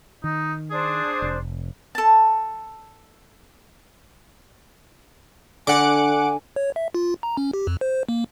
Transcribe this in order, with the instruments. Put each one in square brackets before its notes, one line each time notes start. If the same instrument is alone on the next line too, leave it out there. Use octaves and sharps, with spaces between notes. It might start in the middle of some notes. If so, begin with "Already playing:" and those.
[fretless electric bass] D#3 [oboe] D#4
[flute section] D4 C5 [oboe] G#4
[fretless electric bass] F1
[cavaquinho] A4 A5
[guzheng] D3 [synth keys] F#5 D6 [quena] G#5
[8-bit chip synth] C#5
E5
F4
A#5
C#4
G4
F2
C5
A#3